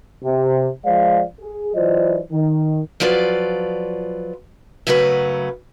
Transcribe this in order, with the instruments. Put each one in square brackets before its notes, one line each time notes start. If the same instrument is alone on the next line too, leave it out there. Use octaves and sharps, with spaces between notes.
[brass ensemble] C3
F3 G#3 C5 D5 F5
G#4
E3 F#3 F4 C5 D5 D#5
D#3
[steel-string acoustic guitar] F3 F#3 F4 B4 D5
F#2 C#3 F#3 A3 C#4 B4